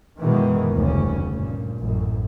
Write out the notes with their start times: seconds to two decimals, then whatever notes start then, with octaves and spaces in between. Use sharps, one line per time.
0.19 F#2 B2 D#3 E3 G#3
0.73 F1 D2 G2 C#3 C#4
1.30 G2 A#2
1.76 A1 F#2